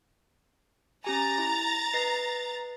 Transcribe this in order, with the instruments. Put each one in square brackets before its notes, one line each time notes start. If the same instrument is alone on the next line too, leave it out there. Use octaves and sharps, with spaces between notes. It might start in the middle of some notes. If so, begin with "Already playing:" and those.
[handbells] C#4 G4 G#5 [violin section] A#5 A6
[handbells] E4 B5
B4 D#5 C7